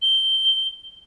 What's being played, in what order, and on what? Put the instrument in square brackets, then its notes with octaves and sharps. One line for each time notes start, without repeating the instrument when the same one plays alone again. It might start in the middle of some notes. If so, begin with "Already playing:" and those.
[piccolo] G7